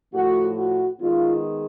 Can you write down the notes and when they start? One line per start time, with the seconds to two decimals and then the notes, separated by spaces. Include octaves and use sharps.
0.13 A2 F3 A3 F#4
0.57 F#4
1.00 D#3 G#3 B3 F4